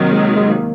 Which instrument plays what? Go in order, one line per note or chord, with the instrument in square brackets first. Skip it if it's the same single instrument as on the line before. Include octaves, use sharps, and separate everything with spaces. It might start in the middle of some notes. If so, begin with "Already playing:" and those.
Already playing: [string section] C3 D#3 F#3 [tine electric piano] A#3
[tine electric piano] G#3
G#3
A#3